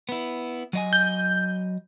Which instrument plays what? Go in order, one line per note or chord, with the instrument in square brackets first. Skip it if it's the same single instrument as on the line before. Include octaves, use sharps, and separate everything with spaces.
[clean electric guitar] B3 E4
F#3 D#5 G#5
[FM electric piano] G6